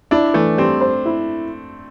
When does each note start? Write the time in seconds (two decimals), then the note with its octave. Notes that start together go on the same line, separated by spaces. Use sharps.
0.11 D4 E4
0.34 E3 A3
0.58 G3 C4
0.81 C5
1.06 E4